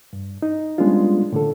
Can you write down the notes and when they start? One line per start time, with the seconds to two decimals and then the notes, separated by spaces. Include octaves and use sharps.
0.13 G2
0.42 D#4
0.78 G3 G#3 B3 C#4 D4 F4
1.33 A2 D3 A4